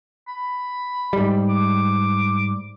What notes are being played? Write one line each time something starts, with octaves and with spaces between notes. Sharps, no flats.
B5
G#2 G3
D6